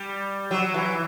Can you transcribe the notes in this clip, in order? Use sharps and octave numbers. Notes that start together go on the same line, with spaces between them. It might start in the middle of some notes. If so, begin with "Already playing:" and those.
Already playing: G3
F#3
E3